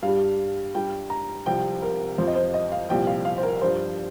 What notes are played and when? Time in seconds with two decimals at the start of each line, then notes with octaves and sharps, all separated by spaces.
0.02 G2 F5
0.08 G3
0.74 G2 G3 G5
1.10 A#5
1.46 C2 C3 F3 G5
1.82 A#4
2.18 F2 F3 C5
2.27 D#5
2.36 C5
2.54 D#5
2.72 F5
2.89 C2 A#2 F3 G5
3.07 F5
3.25 F5
3.38 C5
3.43 A#4
3.61 G2 F3 C5